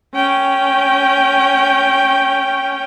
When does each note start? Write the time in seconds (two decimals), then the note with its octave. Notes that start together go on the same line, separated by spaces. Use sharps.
0.15 C#4 G5